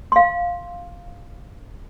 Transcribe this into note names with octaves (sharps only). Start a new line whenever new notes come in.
F5 C6